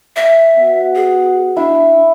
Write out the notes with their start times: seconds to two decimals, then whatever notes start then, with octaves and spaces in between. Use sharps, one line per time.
0.16 E5
0.58 B3 F#4 F#5
0.95 G#4
1.57 D4 E4